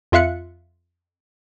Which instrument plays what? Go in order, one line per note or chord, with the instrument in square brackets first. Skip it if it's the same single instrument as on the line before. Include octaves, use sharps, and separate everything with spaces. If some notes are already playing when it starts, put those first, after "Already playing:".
[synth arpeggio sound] F2 F4 E5 F5 F#6 C#7